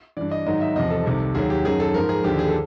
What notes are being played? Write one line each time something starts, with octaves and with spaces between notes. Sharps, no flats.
G2 E3 D5
D#5
G#2 D#3 F#3 D#5
E5
E2 C3 F3 D#5
A4
C2 C3 D#3
D#2 D#3 F#3 G#4
G4
F#2 D#3 F#3 G#4
A4
G#2 F3 A#4
G#4
D#2 D3 F3 G4
G#4
A4